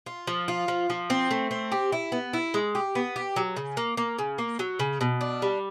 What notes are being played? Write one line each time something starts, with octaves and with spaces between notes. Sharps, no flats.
F4
F3
F4
F3
F3
C4
A3
C4
G4
E4
B3
E4
G#3
G4
B3
G4
F#3
C#3
A#3
A#3
C#3
A#3
F#3
C#3
B2
D4
G3